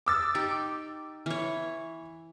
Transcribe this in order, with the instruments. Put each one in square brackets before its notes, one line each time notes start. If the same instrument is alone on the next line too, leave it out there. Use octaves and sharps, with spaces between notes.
[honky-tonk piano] D6 E6 A6
[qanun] D#4 G4 G5
E3 C#5